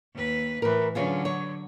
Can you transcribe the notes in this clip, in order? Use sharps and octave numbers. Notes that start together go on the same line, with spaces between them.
D#2 B4
A2 E3 A#4 B4
D3 F#3 C#4 F4 G#4
C#5